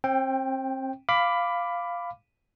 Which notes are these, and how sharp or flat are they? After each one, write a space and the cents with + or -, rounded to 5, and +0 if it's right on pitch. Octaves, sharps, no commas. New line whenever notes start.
C4 +35 G5 +0
F5 +0 B5 +15 D6 +0